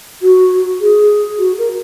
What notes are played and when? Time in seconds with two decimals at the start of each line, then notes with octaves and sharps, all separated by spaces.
0.21 F#4
0.80 G#4
1.38 F#4
1.57 A#4